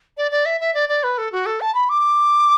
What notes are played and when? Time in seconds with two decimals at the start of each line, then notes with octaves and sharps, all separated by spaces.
0.17 D5
0.31 D5
0.45 E5
0.61 E5
0.74 D5
0.89 D5
1.03 B4
1.18 A4
1.32 F#4
1.46 A4
1.61 A5
1.75 B5
1.89 D6